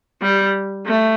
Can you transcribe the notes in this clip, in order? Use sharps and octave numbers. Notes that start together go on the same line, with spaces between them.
G3
A3